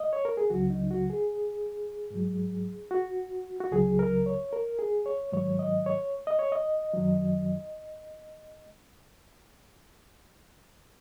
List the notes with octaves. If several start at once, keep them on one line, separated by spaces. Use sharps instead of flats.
D#5
C#5
A#4
G#4
C#2 C#3 F#3 F#4
D#4
F#4
G#4
G#2 F#3
F#4
F#4
C#2 C#3 F#3 G#4
A#4
C#5
A#4
G#4
C#5
G#2 D#3 F#3 C#5
D#5
C#5
D#5
C#5
D#5
F#2 D#3 F#3